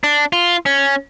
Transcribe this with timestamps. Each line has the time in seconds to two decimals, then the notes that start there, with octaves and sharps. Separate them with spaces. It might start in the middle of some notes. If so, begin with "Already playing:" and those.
0.04 D4
0.33 F4
0.66 C#4